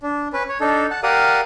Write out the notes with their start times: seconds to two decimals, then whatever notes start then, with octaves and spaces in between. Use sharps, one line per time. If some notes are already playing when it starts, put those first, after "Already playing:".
0.03 D4
0.33 C#4 B4
0.49 C#5
0.61 D4 D#4 A4
0.91 F#5 A5
1.03 G4 A#4 D5 F5 F#5 D#6